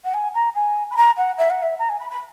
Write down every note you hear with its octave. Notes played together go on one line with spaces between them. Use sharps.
F#5
G#5
A#5
G#5
B5
A#5
F#5
E5
F#5
E5
A#5
G#5
B5
B5